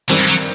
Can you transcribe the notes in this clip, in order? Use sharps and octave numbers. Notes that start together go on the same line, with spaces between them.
G2 D#3 E3 G3 C4
F#3